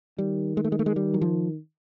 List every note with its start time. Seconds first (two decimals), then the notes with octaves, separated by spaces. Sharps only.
0.18 D#3 G3
0.57 G#3
0.64 A3
0.72 G#3
0.79 A3
0.86 G#3
0.96 G3
1.14 F#3
1.21 F3